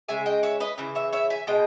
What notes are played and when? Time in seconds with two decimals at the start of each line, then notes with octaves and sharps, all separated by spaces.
0.08 C#3 G#3 E5 G#5
0.26 D#5 G5
0.43 C#5 E5
0.60 B4 D#5
0.78 C#3 E3 E5
0.95 C#5 E5
1.13 C#5 E5
1.30 E5 G#5
1.47 B2 G#3 D#5 G5